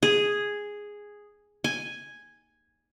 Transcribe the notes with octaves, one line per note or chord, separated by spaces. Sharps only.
G#4
G#5